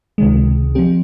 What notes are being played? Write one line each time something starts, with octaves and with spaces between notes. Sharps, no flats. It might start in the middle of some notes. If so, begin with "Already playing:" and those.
C#2 C3 D#3 G#3
F3 C4 G4